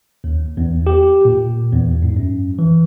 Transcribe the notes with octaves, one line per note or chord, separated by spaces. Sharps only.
D#2
E2
G4
A#2
E2
G#2
F#2
E3